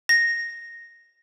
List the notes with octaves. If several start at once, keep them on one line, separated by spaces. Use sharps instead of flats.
A#6